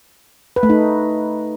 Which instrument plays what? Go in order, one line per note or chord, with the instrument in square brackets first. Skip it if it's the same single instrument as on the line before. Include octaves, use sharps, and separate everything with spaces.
[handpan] B4
A3
D#4